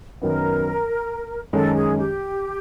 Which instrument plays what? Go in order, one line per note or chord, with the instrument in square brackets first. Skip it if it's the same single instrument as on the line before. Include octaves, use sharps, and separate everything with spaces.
[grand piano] F#2 D#3 F#3 B3 [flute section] A#4
[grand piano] F#2 D#3 G#3 C#4 [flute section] A4
[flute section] G#4
G4